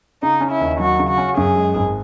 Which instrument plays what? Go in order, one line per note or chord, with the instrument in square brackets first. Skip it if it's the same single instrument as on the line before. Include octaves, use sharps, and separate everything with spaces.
[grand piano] C#3 [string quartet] D#4
[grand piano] C#4
[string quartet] E4
[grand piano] D#2
[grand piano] F#3 [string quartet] F#4
[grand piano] C#3
[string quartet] F#4
[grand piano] C#4
[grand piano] F#2 [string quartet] G#4
[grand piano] G#3
G#1